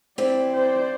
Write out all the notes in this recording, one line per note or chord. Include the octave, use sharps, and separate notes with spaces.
C4 E4 G4 D5
C5 D5